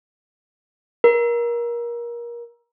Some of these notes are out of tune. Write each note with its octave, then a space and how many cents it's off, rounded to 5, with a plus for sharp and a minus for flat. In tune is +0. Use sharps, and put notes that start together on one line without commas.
A#4 +25